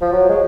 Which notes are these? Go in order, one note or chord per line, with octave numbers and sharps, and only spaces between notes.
F3
F#3
G#3